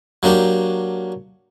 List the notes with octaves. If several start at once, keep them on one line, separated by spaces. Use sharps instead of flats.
F#3 A#3 D4 G4